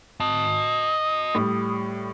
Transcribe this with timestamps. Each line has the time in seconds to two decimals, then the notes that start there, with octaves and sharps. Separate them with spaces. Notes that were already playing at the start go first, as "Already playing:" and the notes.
0.20 D#5 A5 D#6
1.35 A2 G3